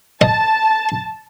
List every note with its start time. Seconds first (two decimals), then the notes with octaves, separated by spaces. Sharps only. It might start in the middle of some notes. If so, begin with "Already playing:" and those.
0.21 D#5 A5